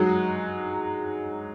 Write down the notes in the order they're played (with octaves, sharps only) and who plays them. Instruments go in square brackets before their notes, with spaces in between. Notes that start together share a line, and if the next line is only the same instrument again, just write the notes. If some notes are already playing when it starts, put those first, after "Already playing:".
Already playing: [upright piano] F#3 G#3 D#4 F#4